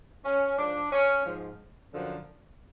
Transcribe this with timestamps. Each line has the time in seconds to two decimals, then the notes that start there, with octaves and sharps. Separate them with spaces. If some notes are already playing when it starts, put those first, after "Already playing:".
0.25 C#4
0.58 G#2 F3 D4
0.92 C#4
1.25 G#2 F3
1.93 F#2 D3 F3